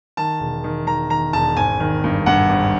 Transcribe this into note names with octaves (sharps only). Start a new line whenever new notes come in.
D#3 A5
E1
D#3
D#3 A#5
D#3 A#5
E1 A5
G#1 G#5
D#3
G2
G2 F#5
G#1